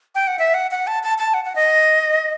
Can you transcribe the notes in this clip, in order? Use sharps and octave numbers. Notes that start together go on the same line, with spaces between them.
G5
F#5
E5
F#5
F#5
A5
A5
A5
F#5
F#5
D#5